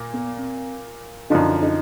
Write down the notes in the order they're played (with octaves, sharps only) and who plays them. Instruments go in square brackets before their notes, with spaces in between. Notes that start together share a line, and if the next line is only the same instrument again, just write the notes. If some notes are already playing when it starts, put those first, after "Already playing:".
Already playing: [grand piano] A#2 A#3
[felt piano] B3
C4
[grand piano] F#2 D3 F3 [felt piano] D#4
[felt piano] D#4